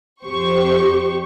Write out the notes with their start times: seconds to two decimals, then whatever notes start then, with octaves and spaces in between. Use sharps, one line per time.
0.24 F2 G4 C5 C#6